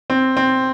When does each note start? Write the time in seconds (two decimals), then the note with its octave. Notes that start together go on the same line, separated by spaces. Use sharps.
0.10 C4
0.37 C4